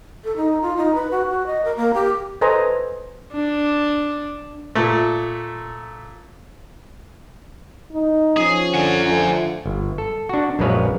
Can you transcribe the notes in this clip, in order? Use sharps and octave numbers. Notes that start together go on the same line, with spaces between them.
A4
D#4
F4
D#4
B4
F#4
F#4
D#5
A#4
A#3
G4
A4 B4 C5 D#5 G#5 A#5
D4
A#2 A3
D#4
F3 C#4 G#4
D3 F#5 G#5
D3 F3 A3
G1
A4
D4 F#4
A#1 F#2 G#3 B4 C#5 F5